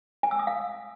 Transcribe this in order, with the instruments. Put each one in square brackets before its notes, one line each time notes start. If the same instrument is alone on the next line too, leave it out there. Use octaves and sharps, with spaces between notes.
[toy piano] G#5
E6
D#6
F5